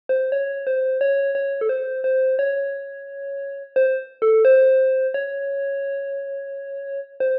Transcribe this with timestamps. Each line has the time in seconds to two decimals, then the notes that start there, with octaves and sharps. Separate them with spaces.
0.09 C5
0.32 C#5
0.67 C5
1.01 C#5
1.35 C#5
1.61 A4
1.69 C5
2.04 C5
2.39 C#5
3.76 C5
4.22 A4
4.45 C5
5.14 C#5
7.20 C5